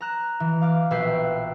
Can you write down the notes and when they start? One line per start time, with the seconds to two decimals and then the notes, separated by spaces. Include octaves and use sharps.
0.01 A#5 F#6 E7
0.40 E3
0.61 F5 D6 F6
0.91 A#1 B2 B4 E5 G5 C7